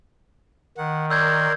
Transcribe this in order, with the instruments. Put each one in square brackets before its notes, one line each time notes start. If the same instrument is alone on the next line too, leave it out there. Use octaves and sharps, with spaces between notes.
[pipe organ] D#3 [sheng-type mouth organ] F#5
[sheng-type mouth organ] A#4 D5 C6 [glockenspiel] E6 G6 G#6